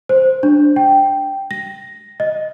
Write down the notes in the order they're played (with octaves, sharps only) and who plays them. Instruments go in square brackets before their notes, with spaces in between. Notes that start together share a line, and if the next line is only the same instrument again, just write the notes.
[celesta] C5
D4
G5
A#6
D#5